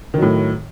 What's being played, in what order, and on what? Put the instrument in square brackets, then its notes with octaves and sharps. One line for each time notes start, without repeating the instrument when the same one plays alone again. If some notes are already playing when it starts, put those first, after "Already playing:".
[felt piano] D#3
F#3
A2